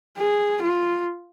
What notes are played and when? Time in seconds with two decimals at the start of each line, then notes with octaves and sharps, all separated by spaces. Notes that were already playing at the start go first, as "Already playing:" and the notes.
0.18 G#4
0.62 F4